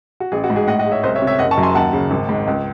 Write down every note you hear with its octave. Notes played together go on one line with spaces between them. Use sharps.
F#4
A1 G#4
F#4
G#2
G#4
A2 D#5 F#5
D#5 F#5
G#3
C#5 E5
C2 C5 D#5
C#5 E5
C3
C#5 E5
F#1 D#5 F#5
A5 C#6
F#2
G#5 C6
D#2 F#5 A5
C#3
G#1
G#2
C#2